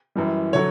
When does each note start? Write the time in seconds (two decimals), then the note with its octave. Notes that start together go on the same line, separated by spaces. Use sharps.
0.15 F#2 E3 G3
0.53 D3 F#3 C#5